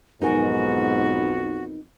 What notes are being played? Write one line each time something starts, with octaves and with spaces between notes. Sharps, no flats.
B1 F2 G#2 B3 D#4 F#4 A#4 G#5